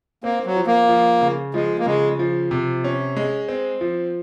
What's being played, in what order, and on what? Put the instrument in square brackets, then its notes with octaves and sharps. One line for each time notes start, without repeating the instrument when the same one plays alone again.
[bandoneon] A#3 [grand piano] C4
[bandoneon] F#3
[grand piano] F3
[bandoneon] A#3
[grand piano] F3
C#3
[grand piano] F3 [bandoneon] G#3
[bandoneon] A#3
[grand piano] C#3 [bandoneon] G#3
[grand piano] F3
C3
C#4
G#3
C4
F3